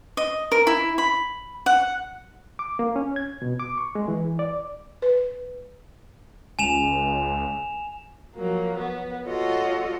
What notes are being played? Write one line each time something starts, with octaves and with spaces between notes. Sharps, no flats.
D#5
A#4
E4
B5
F#5
D6
A#3
C#4
G#6
B2
D6
C#6
G#3
E3
D5
B4
C#2 G#5 E7 F7
F3 F#3 A#3
B3
F4 F#4 A4 C#5 D#5